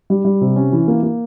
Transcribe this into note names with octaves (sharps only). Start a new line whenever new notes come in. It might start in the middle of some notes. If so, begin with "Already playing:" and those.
G3
G3
C3
C#4
E3
A#3
A#3